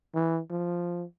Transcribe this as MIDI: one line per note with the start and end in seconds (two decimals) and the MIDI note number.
0.14 0.40 52
0.51 1.04 53